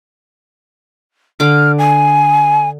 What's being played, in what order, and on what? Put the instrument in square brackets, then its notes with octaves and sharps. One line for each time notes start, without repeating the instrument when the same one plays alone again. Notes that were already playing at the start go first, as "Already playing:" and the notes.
[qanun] D3 D6 [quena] F6
[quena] G#5